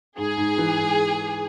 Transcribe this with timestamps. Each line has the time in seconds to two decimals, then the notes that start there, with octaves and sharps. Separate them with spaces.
0.18 G#2 G#4
0.37 G#2
0.58 E3
0.78 G#2